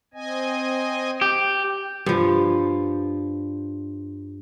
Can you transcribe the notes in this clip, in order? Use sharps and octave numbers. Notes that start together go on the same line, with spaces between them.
C4 D#5 G#5
G4
G2 F3